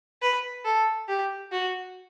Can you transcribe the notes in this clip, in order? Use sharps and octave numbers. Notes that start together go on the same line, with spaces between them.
B4
A4
G4
F#4